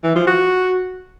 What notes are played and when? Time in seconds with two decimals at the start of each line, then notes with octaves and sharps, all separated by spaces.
0.04 E3
0.15 F3
0.27 F#4